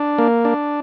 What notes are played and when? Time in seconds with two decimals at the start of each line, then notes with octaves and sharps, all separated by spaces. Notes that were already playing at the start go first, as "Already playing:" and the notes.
Already playing: D4
0.18 A#3
0.45 D4